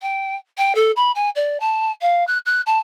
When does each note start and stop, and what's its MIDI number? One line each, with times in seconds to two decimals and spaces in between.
0.02 0.35 79
0.57 0.75 79
0.75 0.91 69
0.96 1.11 83
1.15 1.29 80
1.35 1.59 74
1.60 1.91 81
2.01 2.26 77
2.27 2.38 90
2.46 2.61 90
2.66 2.79 81